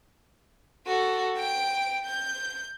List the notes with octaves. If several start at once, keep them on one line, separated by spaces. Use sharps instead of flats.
F#4 A4
G5 D7
G6